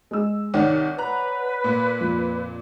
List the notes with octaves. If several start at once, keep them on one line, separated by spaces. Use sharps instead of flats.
G#3 E6
C2 D#3 C#5 D5 F#5
B4 A#5 F#6
A#2
F2